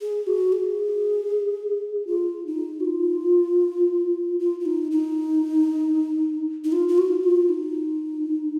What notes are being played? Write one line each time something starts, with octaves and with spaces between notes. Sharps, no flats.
G#4
F#4
G#4
F4
D#4
F#4
F4
F4
F4
D#4
D#4
D#4
F4
F4
F#4
F4
D#4